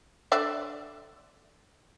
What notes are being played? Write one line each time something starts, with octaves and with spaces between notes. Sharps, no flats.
D3 D5 E5